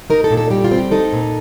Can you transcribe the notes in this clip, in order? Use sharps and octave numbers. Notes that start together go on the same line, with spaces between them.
D#4 A#4
A4
A#2
A4
G3 G4
F4
C4
G4
D#4 A4
A#2